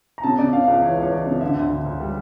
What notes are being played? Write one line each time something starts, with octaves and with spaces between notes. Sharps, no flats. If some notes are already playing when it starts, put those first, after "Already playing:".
A#5
C#3 A5
C#3 D5
C#3 F5
F5
C#2 E5
E3 C#5
C#2
C#5
E3 D5
C#3
D5
D3 E5
D2
D3
D2
G3